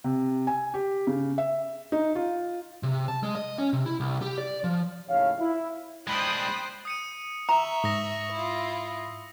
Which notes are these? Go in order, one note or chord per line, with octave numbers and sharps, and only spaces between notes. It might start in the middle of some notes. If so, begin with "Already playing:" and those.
C3
G#5
G4
C#3
E5
D#4
F4
C3
A5
G#3
D#5
C#4
C3
E4
C2
G4
D5
F3
D#2 A2 C#3 C#5 F5
E4
G#3 D4 C5 G5 B5 D#6 F#6
D#6 C#7 D#7
E5 A#5 C#6 E6 F7
G#2 D#6 A#6 F7
E4 F4